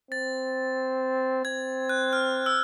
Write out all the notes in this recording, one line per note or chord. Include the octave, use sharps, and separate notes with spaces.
C4 A6
C4 G#6
F#6
F6
E6